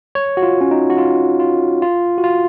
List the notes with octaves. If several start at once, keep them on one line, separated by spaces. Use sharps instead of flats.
C#5
F#4
F4
C#4
D#4
F#4
F4
F4
F4
F#4
F4